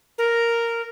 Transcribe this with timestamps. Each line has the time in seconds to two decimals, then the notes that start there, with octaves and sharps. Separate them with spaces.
0.18 A#4